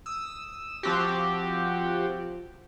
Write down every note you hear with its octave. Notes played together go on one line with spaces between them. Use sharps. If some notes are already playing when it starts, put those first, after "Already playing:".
D#6 E6
F3 C4 F#4 G4